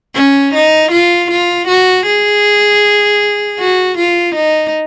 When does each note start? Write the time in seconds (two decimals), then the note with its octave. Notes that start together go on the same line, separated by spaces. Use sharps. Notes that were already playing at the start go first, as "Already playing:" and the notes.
0.15 C#4
0.54 D#4
0.91 F4
1.31 F4
1.68 F#4
2.06 G#4
3.60 F#4
3.98 F4
4.35 D#4